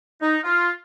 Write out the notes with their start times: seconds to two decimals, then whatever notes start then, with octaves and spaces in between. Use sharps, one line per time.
0.21 D#4
0.44 F4